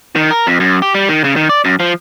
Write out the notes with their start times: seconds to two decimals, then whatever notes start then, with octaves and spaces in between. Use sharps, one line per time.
0.16 D#3
0.31 A#4
0.47 F2
0.60 F#2
0.82 G4
0.95 G3
1.09 D#3
1.24 C#3
1.36 D#3
1.49 D5
1.65 F#2
1.80 F3